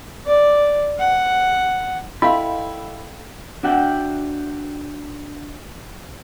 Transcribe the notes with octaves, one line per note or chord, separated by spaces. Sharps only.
D5
F#5
E4 A4 D#5 F5 G5 B5 C6
D4 F#4 E5 F#5 G5